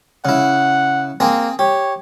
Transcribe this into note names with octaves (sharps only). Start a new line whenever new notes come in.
C#3 E4 F#5
A#3 C4 G#4
G4 C#5